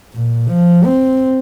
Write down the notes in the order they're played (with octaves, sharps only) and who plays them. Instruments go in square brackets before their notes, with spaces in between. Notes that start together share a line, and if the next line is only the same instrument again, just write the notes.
[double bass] A#2
F3
C4